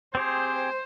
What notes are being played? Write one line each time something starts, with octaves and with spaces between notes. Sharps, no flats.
C4 G4 G#4 C5